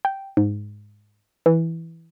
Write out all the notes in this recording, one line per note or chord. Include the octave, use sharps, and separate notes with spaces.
G5
G#2
E3